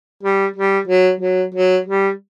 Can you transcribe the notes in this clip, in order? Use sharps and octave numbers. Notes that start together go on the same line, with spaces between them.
G3
G3
F#3
F#3
F#3
G3